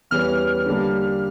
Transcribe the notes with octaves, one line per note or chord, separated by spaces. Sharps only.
E2 E3 G3 C#4 F6
D3 G3 A#3 D4